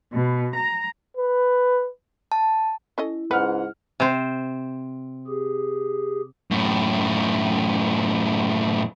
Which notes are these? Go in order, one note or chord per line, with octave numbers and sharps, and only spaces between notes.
B2
A#5
B4
A5
C#4 E4 A4 D#5
C#2 G#2 B4 F#5 F6
C3 C5
G4 G#4
F#2 A2